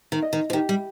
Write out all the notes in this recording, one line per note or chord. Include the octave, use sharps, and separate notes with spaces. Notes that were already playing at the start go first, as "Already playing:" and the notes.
D#3
D#5
D#3
F3
D#3 G4
G3